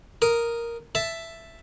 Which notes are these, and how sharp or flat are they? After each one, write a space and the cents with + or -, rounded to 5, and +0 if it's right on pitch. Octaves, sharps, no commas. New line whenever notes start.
A#4 +0 D#6 +0
E5 +5 A5 +0